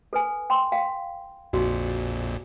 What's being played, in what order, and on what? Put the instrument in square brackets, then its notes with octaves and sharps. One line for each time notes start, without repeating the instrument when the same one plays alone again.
[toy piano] A4 B4 G#5
G5 C6
F5 G5
[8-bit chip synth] A#1 F2 A#2 [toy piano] D#4 F#4